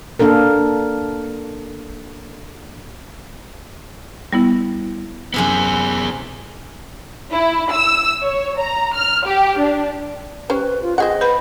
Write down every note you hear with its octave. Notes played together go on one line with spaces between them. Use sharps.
A#3 D4 A4 A#4
G3 B3 E4
F#2 C3 B3 E4 G#4
E4
E6
C#5
A#5
F6
G4
D4
C#4 G4 B4 C5
F4
C4 G#4 D#5 F#5
B4 B5